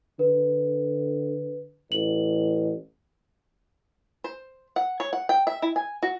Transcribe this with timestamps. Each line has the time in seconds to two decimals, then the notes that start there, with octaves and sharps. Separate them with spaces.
0.19 D3 B4
1.92 A1 F#7
4.24 C5
4.76 F#5
5.00 C#5
5.13 F#5
5.29 G5
5.47 E5
5.62 E4
5.76 G#5
6.03 F#4